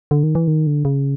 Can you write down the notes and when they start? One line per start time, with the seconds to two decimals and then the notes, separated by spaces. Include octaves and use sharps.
0.11 D3
0.23 D#3
0.35 E3
0.48 D#3
0.67 D3
0.85 C#3